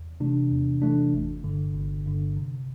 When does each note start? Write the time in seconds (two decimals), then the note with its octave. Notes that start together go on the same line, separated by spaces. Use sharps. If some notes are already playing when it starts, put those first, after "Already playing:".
Already playing: E2
0.20 C3 E3 A3 D4
0.51 E2
0.82 C3 E3 A3 D4
1.13 G1
1.44 G2 D3
1.75 G1
2.05 G2 D3
2.37 C3